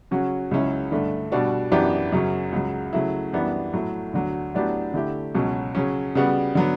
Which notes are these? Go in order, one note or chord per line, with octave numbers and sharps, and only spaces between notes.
C#3 F#3 C#4 F#4
C#2 C#3 F#3 C#4 E4
G2 D3 A3
B2 G3 D4 F#4
F#2 E3 B3 D4 G4
F#2 C#3 F#3 C#4
C#2 C#3 F#3
C#3 F#3 A3 E4
F#2 E3 G3 B3 D4
A2 F#3 A3
D2 D3 F#3
A2 F#3 B3 D4 G4
D3 A3 E4 G4
C#2 B2 F#3 C#4
C#3 F#3 C#4
C#3 G3 B3 F#4
D3 F#3 B3